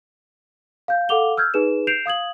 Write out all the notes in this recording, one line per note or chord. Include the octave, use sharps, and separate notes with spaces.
F5 G6
A4 F5 F#5 D6 F7 G7
E6 F6 G6 G#6
D#4 G#4 B4 E7
G6 C7 D7 E7 F7
F5 D#6 G#6 F#7